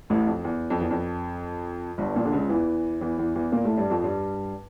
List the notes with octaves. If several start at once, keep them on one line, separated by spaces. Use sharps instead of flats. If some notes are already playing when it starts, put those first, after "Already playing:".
A1 A2
F2
E2
F2
E2
F2
G1 G2
A#1 A#2
D3
C#2 C#3
E2 E3
E2 E3
E2 E3
E2 E3
A#2 A#3
A2 A3
G2 G3
F2 F3
G2 G3